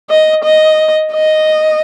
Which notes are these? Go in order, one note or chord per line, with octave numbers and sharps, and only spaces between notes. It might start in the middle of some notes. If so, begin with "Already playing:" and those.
D#5
D#5
D#5